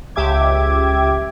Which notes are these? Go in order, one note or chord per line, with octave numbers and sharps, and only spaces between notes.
C#2 G4 E5 D6 G#6